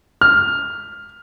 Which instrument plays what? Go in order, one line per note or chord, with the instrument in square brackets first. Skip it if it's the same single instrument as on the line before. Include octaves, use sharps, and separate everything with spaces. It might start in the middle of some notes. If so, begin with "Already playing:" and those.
[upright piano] F6